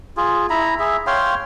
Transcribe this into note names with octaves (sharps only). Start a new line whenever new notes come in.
F4 G#4
E4 A#5 B5
G#4 E5
C#5 F5 G5 C6